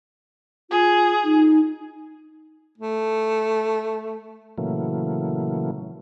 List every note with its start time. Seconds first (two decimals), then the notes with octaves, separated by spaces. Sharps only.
0.71 F4 G#4
1.24 D#4
2.78 A3
4.58 A#2 C#3 E3 F#3 A3 A#3